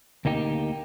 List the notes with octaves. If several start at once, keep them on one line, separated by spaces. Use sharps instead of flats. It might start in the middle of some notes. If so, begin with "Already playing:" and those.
D2 A#3 D#4 G4